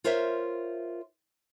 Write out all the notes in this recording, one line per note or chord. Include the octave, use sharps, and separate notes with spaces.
F4 A#4 C5 C#5 E5